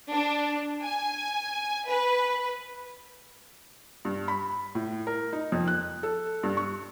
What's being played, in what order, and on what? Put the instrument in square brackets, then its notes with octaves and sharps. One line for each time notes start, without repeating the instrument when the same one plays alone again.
[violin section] D4
G#5
B4
[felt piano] G2
B5
A2
A#4
D#4
F2
F#6
A4
G2
C#6